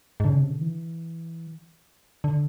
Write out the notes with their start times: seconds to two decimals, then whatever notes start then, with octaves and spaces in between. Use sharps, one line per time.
0.20 G#2
0.25 D3
0.29 C#3
0.40 C3
0.50 D3
0.61 E3
2.24 D3